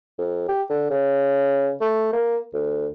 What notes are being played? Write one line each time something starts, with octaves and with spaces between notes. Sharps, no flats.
F2
G4
D3
C#3
A3
A#3
D2